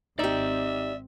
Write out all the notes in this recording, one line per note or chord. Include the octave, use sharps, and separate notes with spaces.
G#1 C4 D#4 G4 D5 E5